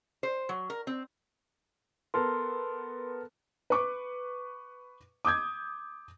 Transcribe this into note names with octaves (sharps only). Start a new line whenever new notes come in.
C5
F#3
A#4
C4
B3 A4 A#4 C6
B4 C#6 D6
D6 D#6 G6 G#6